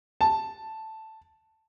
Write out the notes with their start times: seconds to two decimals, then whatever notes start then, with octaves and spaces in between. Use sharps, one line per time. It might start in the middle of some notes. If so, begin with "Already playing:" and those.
0.21 A5